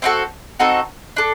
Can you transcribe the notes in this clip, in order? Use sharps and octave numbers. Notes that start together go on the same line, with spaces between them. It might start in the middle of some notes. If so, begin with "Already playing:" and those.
C4 D#4 F#4 A4
C4 D#4 F#4 A4
D4 A4